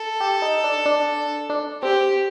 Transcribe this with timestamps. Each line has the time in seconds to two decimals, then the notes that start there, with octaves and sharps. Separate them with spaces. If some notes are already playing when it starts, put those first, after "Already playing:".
Already playing: A4
0.20 G4
0.42 D#4
0.64 D4
0.86 D4
1.50 D4
1.82 C4 G4